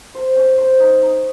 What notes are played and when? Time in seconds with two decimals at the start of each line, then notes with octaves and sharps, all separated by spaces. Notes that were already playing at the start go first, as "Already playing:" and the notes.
0.15 C5
0.36 C#4
0.58 C5
0.80 D#4
1.02 D#4